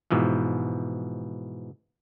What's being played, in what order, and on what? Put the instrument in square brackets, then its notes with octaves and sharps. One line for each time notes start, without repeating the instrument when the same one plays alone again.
[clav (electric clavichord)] G#2 B2 E3 F3